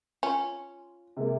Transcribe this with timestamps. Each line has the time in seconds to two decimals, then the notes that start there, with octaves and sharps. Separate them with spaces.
0.23 C#4 F4
1.17 C3 G#3 A#3